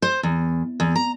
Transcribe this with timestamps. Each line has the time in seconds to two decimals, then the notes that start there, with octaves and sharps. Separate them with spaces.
0.02 C5
0.23 E2
0.80 E2
0.95 A#5